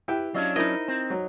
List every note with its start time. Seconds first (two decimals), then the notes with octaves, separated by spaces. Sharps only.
0.08 E4 G4 B4 G5
0.34 F#3 C#4 D4 D5 D#5 F5
0.56 D#4 E4 A#4 C5 D#5 B5
0.88 C4
1.10 F#3